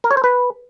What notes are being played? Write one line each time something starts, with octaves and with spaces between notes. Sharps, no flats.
A#4
C#5
C5
B4